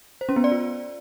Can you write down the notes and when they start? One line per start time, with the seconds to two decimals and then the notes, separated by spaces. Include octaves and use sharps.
0.21 C5
0.29 C#4
0.36 B3
0.44 D5
0.52 F4